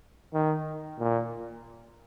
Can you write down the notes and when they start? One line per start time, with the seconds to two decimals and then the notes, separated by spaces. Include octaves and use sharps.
0.34 D#3
0.99 A#2